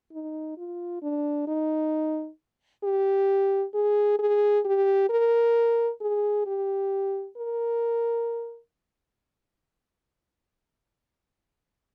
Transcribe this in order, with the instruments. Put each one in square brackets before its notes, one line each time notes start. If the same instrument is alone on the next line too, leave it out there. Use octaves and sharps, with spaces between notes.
[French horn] D#4
F4
D4
D#4
G4
G#4
G#4
G4
A#4
G#4
G4
A#4